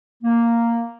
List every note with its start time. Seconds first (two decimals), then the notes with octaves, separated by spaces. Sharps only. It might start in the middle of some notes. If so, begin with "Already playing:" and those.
0.24 A#3